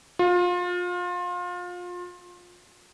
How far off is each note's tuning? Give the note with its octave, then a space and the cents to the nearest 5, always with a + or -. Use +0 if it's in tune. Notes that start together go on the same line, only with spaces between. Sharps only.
F4 +30